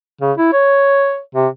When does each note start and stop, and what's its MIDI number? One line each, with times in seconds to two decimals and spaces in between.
0.21 0.33 49
0.38 0.49 64
0.53 1.20 73
1.35 1.48 48